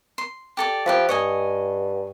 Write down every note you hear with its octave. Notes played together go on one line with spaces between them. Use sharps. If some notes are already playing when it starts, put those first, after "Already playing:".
C6
G4 A4 D5
F3 G4 B4 E5
G2 C#5 D#5 G#5